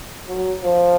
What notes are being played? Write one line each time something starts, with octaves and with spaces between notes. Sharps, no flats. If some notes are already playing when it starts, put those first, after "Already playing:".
F#3
F3